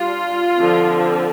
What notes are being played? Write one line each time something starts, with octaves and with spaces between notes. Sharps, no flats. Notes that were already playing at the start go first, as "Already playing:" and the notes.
Already playing: G3 D4 F4
D3 F3 C4